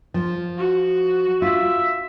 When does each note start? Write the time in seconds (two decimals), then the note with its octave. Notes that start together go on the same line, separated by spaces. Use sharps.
0.14 F3
0.58 F#4
1.42 F4 E5